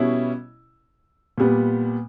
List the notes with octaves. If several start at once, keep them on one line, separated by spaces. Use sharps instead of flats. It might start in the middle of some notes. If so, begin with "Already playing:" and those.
Already playing: B2 G3 C#4 E4
A#2 G3 B3